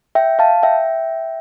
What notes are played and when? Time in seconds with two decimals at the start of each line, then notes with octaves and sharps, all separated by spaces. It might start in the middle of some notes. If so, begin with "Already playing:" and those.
0.15 E5 G5
0.39 F5 A5
0.63 E5 G5